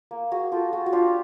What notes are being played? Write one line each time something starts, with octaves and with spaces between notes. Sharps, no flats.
A#3
F#4 G#4
F4 G4 A4
F#4 G#4
F#4
D4 F4 G4